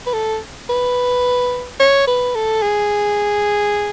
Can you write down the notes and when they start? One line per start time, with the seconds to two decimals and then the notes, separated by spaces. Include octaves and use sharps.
0.06 B4
0.13 A4
0.70 B4
1.80 C#5
2.07 B4
2.35 A4
2.62 G#4